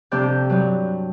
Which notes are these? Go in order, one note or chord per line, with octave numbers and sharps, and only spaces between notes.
F2 C3 C4 D4 G4 G6
G2 F#3